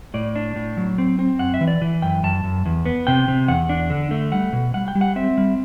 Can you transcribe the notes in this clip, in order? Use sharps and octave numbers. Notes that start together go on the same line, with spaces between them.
A2 D5
D4
A2
F#3
C4
C4
F#2 F#5
E5
E3
D5
E3
F#2 G5
F#2 A5
F#2
E2
B3
C3 G5
C3
E2 F#5
D4
D3
A3
G3 F#5
B2
G3 F#5
G5
G3
F#5
C4 E5
G3